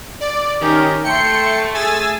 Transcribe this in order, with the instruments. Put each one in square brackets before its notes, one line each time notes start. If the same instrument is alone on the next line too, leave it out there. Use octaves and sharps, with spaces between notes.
[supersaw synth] D5
[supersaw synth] D#3 [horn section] C#4 G4 A#4
[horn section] A3 [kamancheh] G5 C6 [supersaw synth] C#7
[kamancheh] G#4 [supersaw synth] G#5 E6 A6